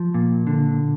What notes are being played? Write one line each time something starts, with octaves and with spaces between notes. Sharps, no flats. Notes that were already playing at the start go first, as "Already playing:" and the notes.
Already playing: F3
A#2
D3